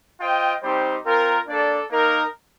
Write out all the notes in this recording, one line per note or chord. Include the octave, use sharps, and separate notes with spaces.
F4 C5 D#5 G5
G3 C4 D#4 G4 C5
C4 F4 A#4
A#3 D4 A4 D5
A#3 D#4 A#4